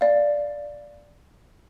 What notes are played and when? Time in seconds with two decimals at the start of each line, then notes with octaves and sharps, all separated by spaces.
0.01 D5 F5